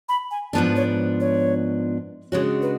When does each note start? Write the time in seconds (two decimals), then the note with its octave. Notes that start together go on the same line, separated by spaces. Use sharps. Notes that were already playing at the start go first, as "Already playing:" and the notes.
0.09 B5
0.31 G#5
0.53 G#2 F3 B3 D4 A5
0.76 C#5
1.20 C#5
2.32 C#3 G#3 D4 F#4 C#5
2.62 B4